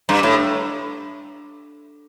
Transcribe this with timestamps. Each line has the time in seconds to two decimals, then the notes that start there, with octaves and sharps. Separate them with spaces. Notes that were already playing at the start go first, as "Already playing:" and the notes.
0.09 G2
0.23 A2